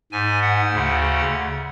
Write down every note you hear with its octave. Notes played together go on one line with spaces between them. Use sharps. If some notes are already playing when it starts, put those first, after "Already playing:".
G#2 G#5
F#5
D2 C#3